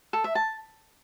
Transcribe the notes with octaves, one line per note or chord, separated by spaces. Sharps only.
A4
E5
A5